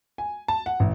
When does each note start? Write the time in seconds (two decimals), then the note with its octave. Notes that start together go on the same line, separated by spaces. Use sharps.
0.18 G#5
0.48 A5
0.66 F#5
0.80 A1